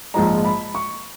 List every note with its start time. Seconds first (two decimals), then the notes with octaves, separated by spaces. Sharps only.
0.14 A#1 G#2 F3 G#3 A#5
0.45 B5
0.75 C#6